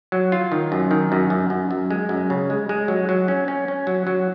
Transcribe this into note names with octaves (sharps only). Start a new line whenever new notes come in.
F#3
F4
D#3
F#2
D#3
F#2
F#2
F#2
F#2
G#3
F#2
C#3
G#3
G#3
F#3
F#3
C#4
C#4
C#4
F#3
F#3